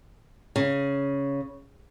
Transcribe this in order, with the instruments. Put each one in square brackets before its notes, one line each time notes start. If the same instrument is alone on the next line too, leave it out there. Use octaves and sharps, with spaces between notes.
[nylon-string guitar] C#3